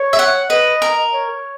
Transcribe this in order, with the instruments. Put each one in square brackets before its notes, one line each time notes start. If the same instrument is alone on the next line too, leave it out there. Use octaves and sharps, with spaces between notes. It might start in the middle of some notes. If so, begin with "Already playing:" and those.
Already playing: [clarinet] C#5
[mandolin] E5
F#5
[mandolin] B4 [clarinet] D#5
[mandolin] A#4
[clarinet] C#5